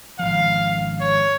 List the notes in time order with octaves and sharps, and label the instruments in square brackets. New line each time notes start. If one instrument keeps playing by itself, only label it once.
[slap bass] G#1 F3 [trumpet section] F5
[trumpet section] C#5